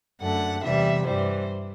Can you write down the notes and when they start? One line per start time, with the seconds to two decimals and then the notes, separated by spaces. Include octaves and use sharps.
0.22 F#2 D3 A3 F#5
0.64 E2 C3 E3 G3 E5
1.06 G2 E3 G3 C5